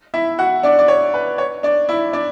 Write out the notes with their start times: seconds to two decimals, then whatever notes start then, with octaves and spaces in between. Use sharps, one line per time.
0.14 E4 E5
0.39 F#4 F#5
0.63 D4 D5
0.79 D5
0.88 C#5
1.14 B4
1.38 C#5
1.63 D4 D5
1.89 E4 E5
2.13 D4 D5